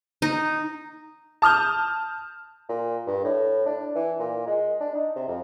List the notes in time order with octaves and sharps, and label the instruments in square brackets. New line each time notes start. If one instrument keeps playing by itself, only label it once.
[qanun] D#4
[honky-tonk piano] A5 D#6 F6 G6
[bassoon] A#2
G2
A2
D4
E3
A#2
G#3
D4
D#4
C3
F2